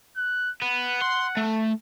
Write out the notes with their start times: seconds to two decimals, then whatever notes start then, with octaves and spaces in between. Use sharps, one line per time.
0.17 F#6
0.62 B3 F#5
1.02 C6
1.37 A3